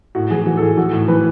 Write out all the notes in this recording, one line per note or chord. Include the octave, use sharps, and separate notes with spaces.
A2 F#4
E3 G#4
E3 F#4
A4
A2 G#4
E3 F#4
A2
E3 B4